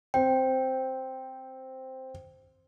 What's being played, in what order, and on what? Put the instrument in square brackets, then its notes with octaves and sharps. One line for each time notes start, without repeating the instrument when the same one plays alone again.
[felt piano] C4 [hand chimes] G5